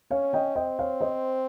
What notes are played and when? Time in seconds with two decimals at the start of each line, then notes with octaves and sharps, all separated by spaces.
0.11 C#4 C#5 F5
0.33 D#5 G5
0.56 C4 D#5 G5
0.79 C#5 F5
1.01 C5 D#5